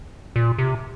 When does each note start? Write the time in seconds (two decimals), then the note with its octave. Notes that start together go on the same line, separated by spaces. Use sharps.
0.36 A#2
0.58 C3